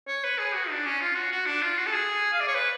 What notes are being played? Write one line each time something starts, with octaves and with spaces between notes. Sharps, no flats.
C#5
B4
G#4
F#4
D4
C#4
F4
F#4
F#4
D4
F4
F#4
A4
G#4
F5
D5
C#5
B4